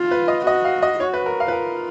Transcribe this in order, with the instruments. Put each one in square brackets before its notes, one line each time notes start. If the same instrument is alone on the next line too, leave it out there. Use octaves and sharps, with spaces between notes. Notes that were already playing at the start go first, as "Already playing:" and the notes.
Already playing: [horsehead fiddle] F4
[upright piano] B4
D#5
[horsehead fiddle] F#4 [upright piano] D#5
[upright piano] F5
D#5
[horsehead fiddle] F#4 [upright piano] C#5
[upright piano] B4
A#4
F5
B4
[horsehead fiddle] F4 [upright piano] A#4